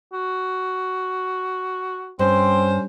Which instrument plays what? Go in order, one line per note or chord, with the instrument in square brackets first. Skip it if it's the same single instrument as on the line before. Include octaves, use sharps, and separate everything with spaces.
[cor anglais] F#4
[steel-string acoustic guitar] G2 [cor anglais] C4 [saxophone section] C#4 C5